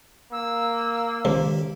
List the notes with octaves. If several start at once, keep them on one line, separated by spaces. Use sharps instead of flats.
A#3 E6
C#2 D#3 F3 G4